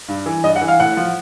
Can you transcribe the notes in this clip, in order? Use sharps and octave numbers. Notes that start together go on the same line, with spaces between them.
G2
E3
G2 D#5
F#5
E3
F5
A2 F#5
F3